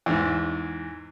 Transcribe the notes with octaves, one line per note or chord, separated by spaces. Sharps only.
E2 G#2